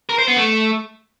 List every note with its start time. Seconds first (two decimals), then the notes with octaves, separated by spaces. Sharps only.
0.09 A#4
0.19 C5
0.28 B3
0.37 A3